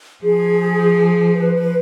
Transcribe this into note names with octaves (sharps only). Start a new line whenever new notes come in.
F3 G#4
B4
B4